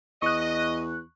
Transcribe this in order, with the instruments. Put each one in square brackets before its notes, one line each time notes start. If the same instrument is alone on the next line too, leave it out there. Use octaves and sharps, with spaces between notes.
[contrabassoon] E2 [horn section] D#5 [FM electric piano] C#6 F#6